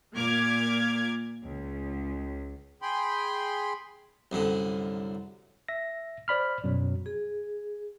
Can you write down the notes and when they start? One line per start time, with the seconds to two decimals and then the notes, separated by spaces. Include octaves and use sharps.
0.14 A#2 A#3 D6 F6 G#6
1.43 C#2
2.82 G#4 G5 B5 C6
4.32 C2 F#2 D3
5.68 E5 A#6
6.28 C5 D5 B5 F6
6.64 F#2 B2 F#3
7.06 G#4